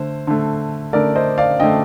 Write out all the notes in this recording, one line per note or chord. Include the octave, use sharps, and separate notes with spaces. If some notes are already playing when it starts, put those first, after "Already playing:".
Already playing: D3 A3 C5
D3 A3
D3 A3 A#4 D5
C5 D#5
D5 F5
D3 A3 D#5 G5